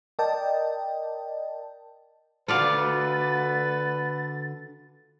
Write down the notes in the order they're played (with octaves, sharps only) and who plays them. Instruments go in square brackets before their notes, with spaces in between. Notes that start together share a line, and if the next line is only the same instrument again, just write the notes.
[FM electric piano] A#4 D5 D#5 G5 A5
[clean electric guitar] D3 F#4 A4 [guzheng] F4 D5 F5 [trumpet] B4 [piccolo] A6